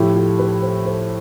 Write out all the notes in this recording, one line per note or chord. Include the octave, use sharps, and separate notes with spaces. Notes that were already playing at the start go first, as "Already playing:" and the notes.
Already playing: A2 F3 A3 E4 G4
F4 A4
G4 B4
A4 C5
A4 C5